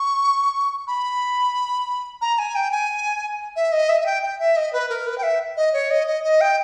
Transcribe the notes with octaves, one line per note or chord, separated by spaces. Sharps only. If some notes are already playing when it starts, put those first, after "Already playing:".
Already playing: C#6
B5
A#5
G#5
G5
G#5
E5
D#5
E5
E5
G5
G5
E5
D#5
B4
A#4
B4
G5
E5
D#5
C#5
D#5
D#5
D#5
G5